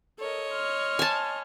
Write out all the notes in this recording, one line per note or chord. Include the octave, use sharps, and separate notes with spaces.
A4 A#4 C#5 D#5
C6 F6
G#5 A5